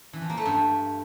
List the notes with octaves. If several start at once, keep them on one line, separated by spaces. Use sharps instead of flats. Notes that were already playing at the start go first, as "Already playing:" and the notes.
E3
F3
A#3
A3
G2